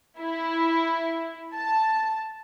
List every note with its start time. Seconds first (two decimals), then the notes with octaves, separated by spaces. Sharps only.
0.19 E4
1.55 A5